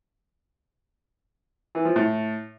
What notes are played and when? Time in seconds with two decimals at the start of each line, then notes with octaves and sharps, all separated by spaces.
1.75 E3
1.85 F3
1.96 A2